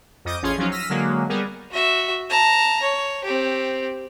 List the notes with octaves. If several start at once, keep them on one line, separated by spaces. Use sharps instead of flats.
F2 D#5 D6 D#6 G6
A1 C#4 F4 G#4 C6 G#6
F3 F#3 C#4 D#4 F4
E6 F6 A#6 B6 D#7
D3 F#3 G#3 A#3
G3 B3 G#4 A#4
F#4 E5
A5 A#5
C#5
C4 G4